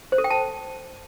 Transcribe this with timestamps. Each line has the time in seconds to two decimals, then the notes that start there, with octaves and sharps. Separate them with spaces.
0.12 C5
0.18 A4
0.24 G5
0.30 A5